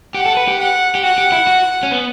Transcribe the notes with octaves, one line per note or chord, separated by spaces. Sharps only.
G4 F#5
A4
B4
G4
F#5
G4
F#4 F#5
G4
E4
F#4
C#4
B3